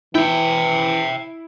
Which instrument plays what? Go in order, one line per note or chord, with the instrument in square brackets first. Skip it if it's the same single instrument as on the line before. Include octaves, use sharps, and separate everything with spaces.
[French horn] E3 [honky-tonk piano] E4 [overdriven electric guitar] E5 G5